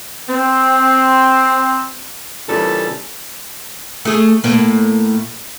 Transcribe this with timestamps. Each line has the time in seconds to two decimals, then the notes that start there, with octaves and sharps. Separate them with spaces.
0.29 C4
2.49 A#2 C#3 E3 G3 D4 A4
4.05 A3 G#4
4.44 A2 A#3